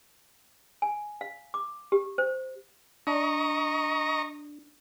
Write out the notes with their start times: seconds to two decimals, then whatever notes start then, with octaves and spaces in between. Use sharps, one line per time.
0.82 G#5
1.21 F5
1.54 D6
1.92 G4
2.18 C5
3.07 D4 D#5 A#5 C#6